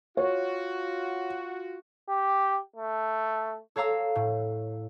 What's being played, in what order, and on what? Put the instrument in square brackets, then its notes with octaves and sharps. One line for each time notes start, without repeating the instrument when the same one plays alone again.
[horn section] F4 F#4 [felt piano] C#5
[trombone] G4
A3
[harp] A4 C#5 F5 A#5 E6
A2